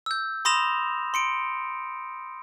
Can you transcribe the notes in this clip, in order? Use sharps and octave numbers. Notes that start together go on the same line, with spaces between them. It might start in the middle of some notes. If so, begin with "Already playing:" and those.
E6 G6
B5 C6 D#6 A#6 E7 F7
C6 C#7 D7